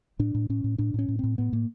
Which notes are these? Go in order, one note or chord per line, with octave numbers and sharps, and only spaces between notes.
A2 D4
A2
A2 C#4
A2
A2 D4
A2 C#4
A2
A2 C4
A2 B3
A2 A#3